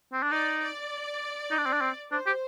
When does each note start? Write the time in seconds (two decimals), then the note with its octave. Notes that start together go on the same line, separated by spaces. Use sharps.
0.13 C4
0.23 D4
0.31 D#4 D5
0.61 D5
1.51 D#4
1.58 D4
1.66 C4
1.73 D4
1.81 C4
2.12 D4 C5
2.26 G4